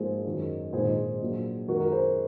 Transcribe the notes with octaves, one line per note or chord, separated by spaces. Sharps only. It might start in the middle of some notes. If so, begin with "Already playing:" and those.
Already playing: G#1 G#2 F3 A#3 G#4 C5
F#2 D#3 G#3
A#1 G#2 D#3 G#4 C5
A#1 A#2 F#3 A#3
F#2 D#3 G#3 F#4 A#4
A#4
G#4 C5